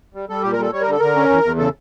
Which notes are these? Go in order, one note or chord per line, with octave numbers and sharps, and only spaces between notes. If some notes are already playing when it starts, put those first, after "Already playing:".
G3
G3 A4
A#2 G4
A#4
G3 A4
G3 C#5
A#4
D3 A4
D3 A#4
C#4
E2
E2
C#3 A4